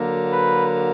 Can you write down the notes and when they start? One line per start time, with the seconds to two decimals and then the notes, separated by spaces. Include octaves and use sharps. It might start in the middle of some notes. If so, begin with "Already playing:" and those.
Already playing: D3 F#3 A#3
0.32 B4